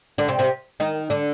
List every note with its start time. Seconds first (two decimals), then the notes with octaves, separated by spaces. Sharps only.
0.18 D3 D4
0.28 C3 C4
0.39 C3 C4
0.80 D#3 D#4
1.10 D3 D4